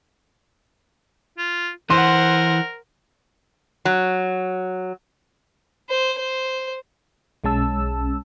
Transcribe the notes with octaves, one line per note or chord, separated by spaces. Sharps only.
F4
E3 A#4 C5 F#5 C6
F#3
C5
C5
B1 G#3 C#4 A5 E6